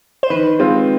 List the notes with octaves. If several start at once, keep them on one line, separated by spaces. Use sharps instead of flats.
C5
D#3 B4
G#3 C4 F4